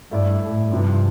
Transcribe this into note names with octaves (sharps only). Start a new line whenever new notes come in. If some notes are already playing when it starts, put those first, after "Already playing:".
G2 A3 E4 A4 D5
A2
G2 C3 F3 C4